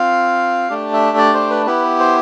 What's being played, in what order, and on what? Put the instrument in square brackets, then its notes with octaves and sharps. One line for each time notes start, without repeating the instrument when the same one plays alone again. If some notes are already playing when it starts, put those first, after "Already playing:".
Already playing: [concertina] C4 F4 F5
A3 D4 G4
E5
D5
C5
B4
B3 E4 G4 B4
C5